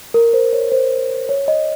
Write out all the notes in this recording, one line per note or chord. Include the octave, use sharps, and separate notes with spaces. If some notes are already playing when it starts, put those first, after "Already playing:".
A#4
C5
C#5
C5
C#5
D#5